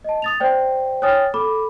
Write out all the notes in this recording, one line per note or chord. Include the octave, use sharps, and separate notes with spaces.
D#5 A5
D#6 A6 F7
C5 D5 G5
C#5 G5 G#5 D#6 F6 A6
A4 B5 D6